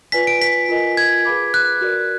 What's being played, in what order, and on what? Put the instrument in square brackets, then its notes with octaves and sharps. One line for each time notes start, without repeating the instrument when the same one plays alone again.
[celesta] F4 B4 D5 G#5 [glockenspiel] B6
[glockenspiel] D7
B6
[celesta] F4 A#4 D#5 G#5
[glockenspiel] G#6
[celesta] G#4 B4 F5 B5 D6
[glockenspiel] F#6
[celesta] F#4 A#4 D5